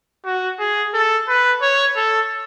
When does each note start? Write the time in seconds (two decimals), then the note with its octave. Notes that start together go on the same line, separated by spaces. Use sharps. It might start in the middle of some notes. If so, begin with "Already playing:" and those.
0.25 F#4
0.59 G#4
0.94 A4
1.29 B4
1.62 C#5
1.96 A4